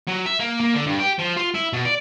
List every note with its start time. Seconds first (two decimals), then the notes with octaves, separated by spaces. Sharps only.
0.08 F#3
0.26 E5
0.40 A#3
0.60 A#3
0.74 D3
0.86 G2
0.99 G4
1.18 F3
1.37 F4
1.54 E4
1.73 B2
1.85 D5